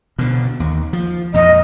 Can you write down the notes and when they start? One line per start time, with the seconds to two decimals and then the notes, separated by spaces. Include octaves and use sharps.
0.19 B2 D3
0.60 D#2
0.93 F3
1.34 F2 A#2 D#5